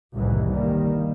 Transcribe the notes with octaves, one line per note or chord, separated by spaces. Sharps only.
F#1 C2 A2 D#3 E3
G1 D#3 G3 A#3